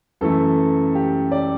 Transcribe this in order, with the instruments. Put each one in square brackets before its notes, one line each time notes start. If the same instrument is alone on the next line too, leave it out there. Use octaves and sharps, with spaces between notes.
[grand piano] F#2 E3 A3 A4
G4
D5